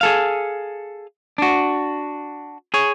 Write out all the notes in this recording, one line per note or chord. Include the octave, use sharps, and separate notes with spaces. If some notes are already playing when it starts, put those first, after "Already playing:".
G#4 A4 F5
D4 F#4
G#4 C#5